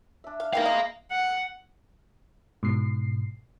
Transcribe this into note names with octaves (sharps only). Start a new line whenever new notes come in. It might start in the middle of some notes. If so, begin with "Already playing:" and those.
D4 E5
F5
D#3 E3 A#4 F5 G5
G#3 B3 D#5
F#5
G#2 B2 C7